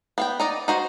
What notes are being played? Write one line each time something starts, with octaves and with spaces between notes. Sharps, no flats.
B3 F5 G5
D#4 D5 D#5
D#4 F#4 C5